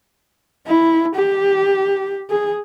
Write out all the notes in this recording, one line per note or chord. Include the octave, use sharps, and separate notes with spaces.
E4
G4
G#4